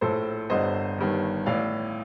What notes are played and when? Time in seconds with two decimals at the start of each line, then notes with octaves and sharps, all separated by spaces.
0.01 A#1 A2 A4 C5
0.50 G1 G2 D3 C5 D#5
0.98 G1 G2 D#3
1.46 A1 A2 D5 F5